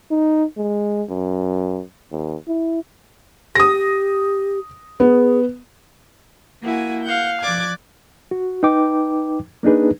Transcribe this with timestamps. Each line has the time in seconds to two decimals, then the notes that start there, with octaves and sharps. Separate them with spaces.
0.10 D#4
0.57 G#3
1.09 F#2
2.11 D#2
2.47 E4
3.55 G4 D#6 A#6
5.00 B3 G#4
6.62 A#3 E4 F#4 G#5
7.04 F5 F#5 G6
7.41 F3 D5 D6 F#6 G#6
8.31 F#4
8.63 D#4 B4 G5 D6
9.63 A#3 D4 D#4 G#4 B4